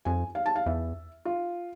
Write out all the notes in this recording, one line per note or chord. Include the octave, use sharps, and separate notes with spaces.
F2 G#5
F5
A5
F5
E2 E5
F4